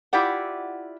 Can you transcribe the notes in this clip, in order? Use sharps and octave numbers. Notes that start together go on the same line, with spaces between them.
E4 F4 G4 D5 F#5